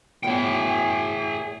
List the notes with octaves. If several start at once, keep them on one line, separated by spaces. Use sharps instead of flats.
E2 A2 G#4 G5